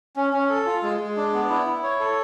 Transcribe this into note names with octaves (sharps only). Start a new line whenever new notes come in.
C#4
C#4
A4
F4
G#3
G#3
D4
B3
E4
E4
C#5
A4